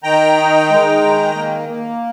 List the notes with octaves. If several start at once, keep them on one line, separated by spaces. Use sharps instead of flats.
D#3 G5 A#5
D#4
G#3
D#3
A#3
A#3